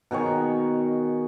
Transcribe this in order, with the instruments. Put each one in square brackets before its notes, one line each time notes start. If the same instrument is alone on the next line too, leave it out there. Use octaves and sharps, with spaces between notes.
[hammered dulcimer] B2 D#3 G#4 C#5